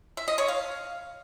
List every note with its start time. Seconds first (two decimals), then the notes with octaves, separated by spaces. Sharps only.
0.17 E5
0.28 D#5
0.38 C#5
0.48 F5